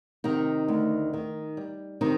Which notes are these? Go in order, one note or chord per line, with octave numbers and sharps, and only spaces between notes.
C3 D#3 D#4
D2
D#3
G3
C3 D#3 D#4